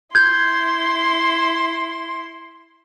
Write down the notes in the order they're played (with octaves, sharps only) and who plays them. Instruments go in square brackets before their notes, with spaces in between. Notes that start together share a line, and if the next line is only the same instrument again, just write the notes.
[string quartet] E4 C6 [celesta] G6 G#6